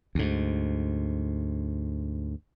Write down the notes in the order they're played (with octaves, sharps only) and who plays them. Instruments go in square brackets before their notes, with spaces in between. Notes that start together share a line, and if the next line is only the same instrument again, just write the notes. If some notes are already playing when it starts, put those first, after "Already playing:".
[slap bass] D2 G#2